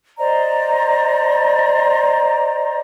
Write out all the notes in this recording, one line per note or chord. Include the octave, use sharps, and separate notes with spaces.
C5 D5 D#5 A#5